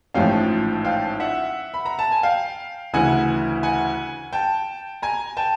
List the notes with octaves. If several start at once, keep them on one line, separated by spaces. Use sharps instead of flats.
A1 G#2 F3 A3 C#4 F5 G5
F5 G5
E5 F#5
B5
A#5
A5
G#5
F5 G5
D2 C#3 E3 F#5 G#5
F#5 G#5
G5 A5
G#5 A#5
G5 A5